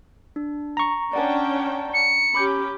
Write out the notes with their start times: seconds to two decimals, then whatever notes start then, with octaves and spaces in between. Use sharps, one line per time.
0.36 D4
0.77 A#5 C#6
1.13 C#4 D4 D5 F#5 G5 A5
1.94 C#7
2.35 C#4 G4 B5 D6 G6